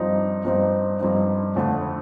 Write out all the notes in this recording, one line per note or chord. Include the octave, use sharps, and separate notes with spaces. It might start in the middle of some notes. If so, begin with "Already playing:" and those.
Already playing: G2 F3 C4 D#4
G2 F3 C4 D#4
G2 F3 C4 D#4
F2 D3 F3 A3